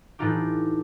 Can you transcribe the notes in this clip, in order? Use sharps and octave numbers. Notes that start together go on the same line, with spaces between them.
A2 E3 D4 D#4 F4 G4